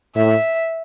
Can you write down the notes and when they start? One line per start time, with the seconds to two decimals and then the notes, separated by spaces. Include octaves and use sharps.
0.15 A2 E5